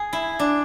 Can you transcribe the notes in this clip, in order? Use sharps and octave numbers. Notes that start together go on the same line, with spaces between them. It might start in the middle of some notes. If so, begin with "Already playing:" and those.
Already playing: G#4
E4
D4